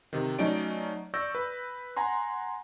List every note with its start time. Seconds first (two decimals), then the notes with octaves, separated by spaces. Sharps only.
0.13 C3 D#3
0.39 F#3 A3 C#4 D#4 D5 D7
1.14 D5 C#6 E6 G6 A#6
1.35 B4
1.96 F#5 G#5 A#5 C6